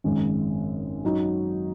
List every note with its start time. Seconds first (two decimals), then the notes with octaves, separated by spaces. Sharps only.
0.04 G#1 F#2 C#3 G#3
1.04 F#2 F#3 D#4